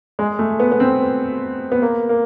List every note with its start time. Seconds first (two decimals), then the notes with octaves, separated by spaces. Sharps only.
0.19 G#3
0.39 A3
0.60 B3
0.72 B3
0.80 C4
1.72 B3
1.82 A#3
2.09 A#3